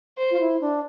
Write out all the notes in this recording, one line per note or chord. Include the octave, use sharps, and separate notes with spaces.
C5
F4
E4
D4